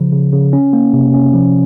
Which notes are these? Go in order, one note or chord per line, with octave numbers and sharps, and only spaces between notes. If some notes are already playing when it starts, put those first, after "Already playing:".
Already playing: C#3 F3
C#3
C#3
C#4
A#3
C3
C#4
F3